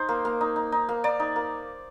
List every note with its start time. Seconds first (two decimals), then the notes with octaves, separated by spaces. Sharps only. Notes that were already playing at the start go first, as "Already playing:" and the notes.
Already playing: D#4 C5
0.09 A#3
0.25 A#3
0.41 D#4
0.56 D#4
0.72 D#4
0.89 A#3
1.04 A#3 D5
1.20 D#4
1.36 A#3